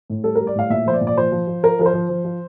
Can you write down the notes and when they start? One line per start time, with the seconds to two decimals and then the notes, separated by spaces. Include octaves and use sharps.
0.10 A2
0.24 G3 A4
0.35 G3 A#4
0.47 D5
0.55 A2 F5
0.70 A#2 E5
0.86 F3 C5
0.93 D5
1.01 A#2
1.07 D5
1.16 F3 C5
1.32 F3
1.47 F3
1.63 F3 A#4
1.79 F3 A#4
1.86 C5
1.93 F3
2.09 F3
2.24 F3